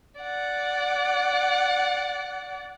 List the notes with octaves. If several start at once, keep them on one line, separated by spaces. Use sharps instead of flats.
D5 F#5